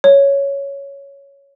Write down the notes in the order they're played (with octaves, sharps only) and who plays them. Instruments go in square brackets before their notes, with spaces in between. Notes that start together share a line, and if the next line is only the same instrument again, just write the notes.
[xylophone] C#5